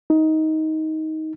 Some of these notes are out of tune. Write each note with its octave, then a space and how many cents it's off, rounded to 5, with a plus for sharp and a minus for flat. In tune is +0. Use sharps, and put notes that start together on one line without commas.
D#4 +15